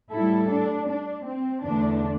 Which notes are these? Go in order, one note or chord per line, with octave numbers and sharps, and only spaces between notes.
A2 G3 E4 A4
D4
D4
C4
E2 D3 A3 D4